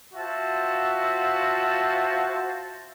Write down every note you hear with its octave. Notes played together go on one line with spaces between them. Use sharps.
F4 F#4 C5 E5 A5